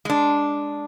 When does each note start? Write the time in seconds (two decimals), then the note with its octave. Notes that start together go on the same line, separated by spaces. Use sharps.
0.05 G#3 D4